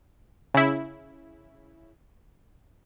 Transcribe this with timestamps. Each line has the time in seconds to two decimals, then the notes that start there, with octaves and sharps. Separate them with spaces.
0.54 C#3 E4